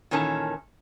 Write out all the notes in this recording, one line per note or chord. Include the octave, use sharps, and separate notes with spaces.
A#2 D#3 E3 C#4 A4 A5